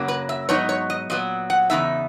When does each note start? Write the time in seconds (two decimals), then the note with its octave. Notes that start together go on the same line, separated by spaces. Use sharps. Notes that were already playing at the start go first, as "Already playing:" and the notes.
Already playing: F#2 C#3 F#3 A#3
0.08 B4
0.29 E5
0.49 G#2 F#3 B3 D#4 C#5
0.69 C#5
0.90 D#5
1.10 A#2 F#3 B3 D#5
1.50 F#5
1.70 E2 C#3 E3 B3 D#4 E5